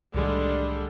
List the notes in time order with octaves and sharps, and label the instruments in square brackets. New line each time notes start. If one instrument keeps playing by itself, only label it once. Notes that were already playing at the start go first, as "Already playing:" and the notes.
[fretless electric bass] C2 A2 D#3 [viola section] D3 G3 G#3